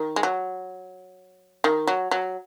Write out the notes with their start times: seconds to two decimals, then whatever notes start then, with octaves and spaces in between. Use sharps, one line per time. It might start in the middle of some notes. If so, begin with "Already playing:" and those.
Already playing: D#3
0.16 G#3
0.23 F#3
1.64 D#3
1.87 F#3
2.11 F#3